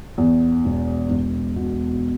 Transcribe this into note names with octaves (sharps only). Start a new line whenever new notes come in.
E2
E1
E1
B2